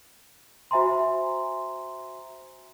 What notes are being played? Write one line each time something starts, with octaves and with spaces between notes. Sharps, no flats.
F#4 C5 E5 G#5 A#5 C6